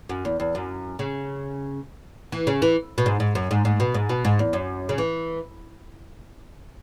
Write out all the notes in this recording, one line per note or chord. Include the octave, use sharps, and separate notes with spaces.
F#2
E2
E2
F#2
C#3
E3
C#3
E3
B2
G#2
G#2
F#2
G#2
G#2
B2
G#2
B2
G#2
E2
F#2
C#3
E3